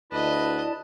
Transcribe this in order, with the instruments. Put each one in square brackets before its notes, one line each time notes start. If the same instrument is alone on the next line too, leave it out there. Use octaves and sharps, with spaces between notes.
[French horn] D2 [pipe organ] E4 D5 A5 [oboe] B4 [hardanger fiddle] D#5